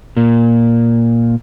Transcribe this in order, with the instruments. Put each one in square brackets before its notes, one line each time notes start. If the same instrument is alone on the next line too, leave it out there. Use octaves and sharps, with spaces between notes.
[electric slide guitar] A#2 A#3